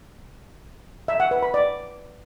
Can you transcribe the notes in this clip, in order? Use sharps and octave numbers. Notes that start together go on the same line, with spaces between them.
E5
F#5
B4
B5
D5